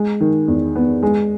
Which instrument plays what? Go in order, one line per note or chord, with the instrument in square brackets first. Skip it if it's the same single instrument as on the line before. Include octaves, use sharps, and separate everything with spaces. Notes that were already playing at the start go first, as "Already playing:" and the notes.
Already playing: [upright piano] G#3
D#3
E2
B3
G#3